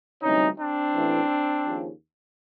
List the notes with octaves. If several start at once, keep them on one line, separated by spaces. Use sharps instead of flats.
D2 C3 E3 G3 C#4 D#4
C4 D4
A1 A2 E3
D#2 C#3 F3